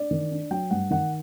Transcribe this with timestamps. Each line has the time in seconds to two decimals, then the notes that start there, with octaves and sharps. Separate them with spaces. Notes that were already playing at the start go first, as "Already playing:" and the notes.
Already playing: D4 D5
0.11 D#3
0.31 D4
0.51 F#3 G5
0.71 G2 F#5
0.90 D#3 F#5